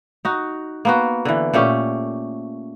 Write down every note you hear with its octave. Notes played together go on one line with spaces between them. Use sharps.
D#4 F#4
A#3 B3 F#4
D3 E3
A#2 A3 C#4 G4